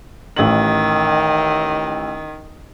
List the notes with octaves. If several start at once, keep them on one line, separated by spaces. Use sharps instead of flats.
A1 D#3 F#7